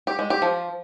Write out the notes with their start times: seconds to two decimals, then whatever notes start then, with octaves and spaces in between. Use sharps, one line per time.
0.07 G4
0.19 G#3
0.30 G4
0.42 F3